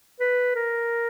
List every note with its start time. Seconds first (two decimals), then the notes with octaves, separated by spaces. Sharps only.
0.20 B4
0.55 A#4